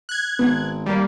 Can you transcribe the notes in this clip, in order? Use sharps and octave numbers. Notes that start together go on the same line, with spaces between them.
F#6 G#6
G#1 B3
G3 A#3